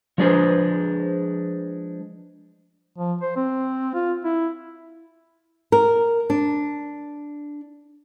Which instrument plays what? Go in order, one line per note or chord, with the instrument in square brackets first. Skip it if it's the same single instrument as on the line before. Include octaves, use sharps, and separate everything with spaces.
[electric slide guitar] F3 G#3 D4 G#4 B4 C5
[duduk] F3
C5
C4
F4
E4
[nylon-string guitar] A#4
D4